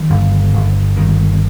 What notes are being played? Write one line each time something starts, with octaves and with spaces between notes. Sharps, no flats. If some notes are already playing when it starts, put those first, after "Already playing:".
Already playing: D#3
G1
G1
G1 D#3